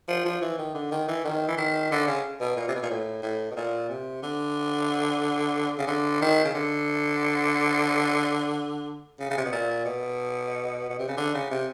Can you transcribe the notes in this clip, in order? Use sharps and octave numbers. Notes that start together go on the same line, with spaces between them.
F3
F3
E3
D#3
D3
D#3
E3
D#3
E3
D#3
D3
C#3
B2
A#2
C3
B2
A#2
A2
A2
B2
A#2
C3
D3
C#3
D3
D#3
C#3
D3
C#3
C#3
C3
B2
A#2
B2
B2
C3
C#3
D3
C#3
C3